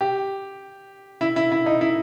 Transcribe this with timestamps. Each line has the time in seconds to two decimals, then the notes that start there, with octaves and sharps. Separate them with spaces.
0.01 G4
1.21 E4
1.36 E4
1.52 E4
1.66 D#4
1.81 E4